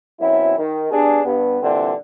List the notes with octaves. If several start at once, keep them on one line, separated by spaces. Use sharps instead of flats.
F#2 B2 F#3 C4 E4
D#3
B3 D4 G4 G#4
G2 B3
A#2 D3 E3 G3 C4 D4